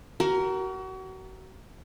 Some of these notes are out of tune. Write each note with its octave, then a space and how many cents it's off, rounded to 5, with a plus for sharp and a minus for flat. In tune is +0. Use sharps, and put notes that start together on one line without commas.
F#4 +35 A#4 +0